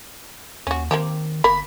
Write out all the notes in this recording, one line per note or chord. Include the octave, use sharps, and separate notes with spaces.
D#2 C#4 F#4
D#3 A#3 C4 G4
G1 A#3 A#4 B5